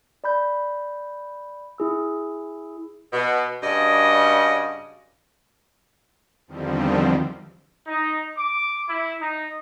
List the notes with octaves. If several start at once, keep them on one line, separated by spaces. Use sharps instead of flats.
D5 B5 G6
E4 G#4 E6
B2
G2 C#3 F#4 D5 D#5
E2 D3 D#3 F3 G3 C4
D#4
D6
E4
D#4